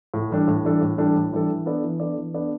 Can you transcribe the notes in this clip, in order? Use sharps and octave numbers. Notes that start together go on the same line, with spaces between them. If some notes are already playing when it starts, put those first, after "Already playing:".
A2
E3 G3 D4 A4
A2
E3 G3 D4 A4
A2
E3 G3 D4 A4
A2
E3 G3 D4 A4
E3
B3 D4 A4 D5
E3
B3 D4 A4 D5
E3
B3 D4 A4 D5